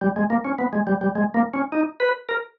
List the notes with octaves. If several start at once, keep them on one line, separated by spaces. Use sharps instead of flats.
G3
G#3
A#3
C#4
B3
G#3
G3
G3
G#3
A#3
C#4
D#4
B4
A#4